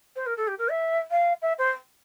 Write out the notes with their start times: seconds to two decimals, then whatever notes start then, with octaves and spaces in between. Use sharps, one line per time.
0.16 C5
0.26 A#4
0.37 A4
0.47 G4
0.58 A#4
0.69 E5
1.11 F5
1.42 E5
1.58 C5